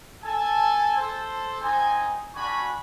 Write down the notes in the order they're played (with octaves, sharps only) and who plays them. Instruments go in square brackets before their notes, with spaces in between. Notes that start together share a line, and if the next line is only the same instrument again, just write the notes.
[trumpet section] A4 G#5 A5
A4 C5
C4 D#4 G#5
G3 D4 F#4 G#5 B5 C#6